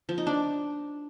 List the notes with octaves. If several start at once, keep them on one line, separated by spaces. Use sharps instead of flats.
F3
D#4
D4